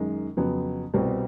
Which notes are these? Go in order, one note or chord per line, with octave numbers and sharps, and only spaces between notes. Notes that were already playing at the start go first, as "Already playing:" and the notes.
Already playing: F#2 D#3 G#3
F2 C#3 F#3 B3
C2 B2 G3 C4